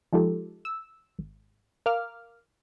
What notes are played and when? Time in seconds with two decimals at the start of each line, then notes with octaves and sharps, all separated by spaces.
0.13 F3 G#3 D#4 F4 G4 A4
0.65 E6
1.19 G#1
1.86 A#4 F5 D6 F6